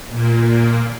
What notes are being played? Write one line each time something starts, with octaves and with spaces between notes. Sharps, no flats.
A#2 A#3